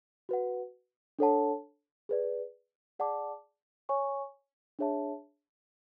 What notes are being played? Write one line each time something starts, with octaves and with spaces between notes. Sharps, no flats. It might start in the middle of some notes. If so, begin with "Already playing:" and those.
F#4 B4 F#5
D4 A4 C#5 F#5 A5
G#4 B4 D5
G#4 D5 F#5 A5 D6
C#5 G#5 C#6
D4 G#4 C#5 E5 A5